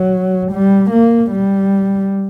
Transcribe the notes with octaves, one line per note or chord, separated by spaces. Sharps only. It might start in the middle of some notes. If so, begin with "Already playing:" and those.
Already playing: F#3
G3
A#3
G3